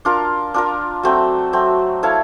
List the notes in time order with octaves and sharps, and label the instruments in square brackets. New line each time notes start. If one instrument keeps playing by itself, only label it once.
[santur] D4 F4 A#4
D4 F4 A#4
F#3 A3 C4
F#3 A3 C4
E4 A4 C#5 F5